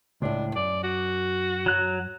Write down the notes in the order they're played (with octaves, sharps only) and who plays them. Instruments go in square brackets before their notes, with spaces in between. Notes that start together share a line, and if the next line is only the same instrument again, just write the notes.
[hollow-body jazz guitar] C#2 A2 [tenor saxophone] D4
[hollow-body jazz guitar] F#2 [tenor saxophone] D5
[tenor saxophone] F#4
[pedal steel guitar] F#3 F#6